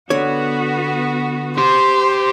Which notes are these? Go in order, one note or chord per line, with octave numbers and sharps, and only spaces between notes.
D3 B3 F#4 C#5
G4 C5 C6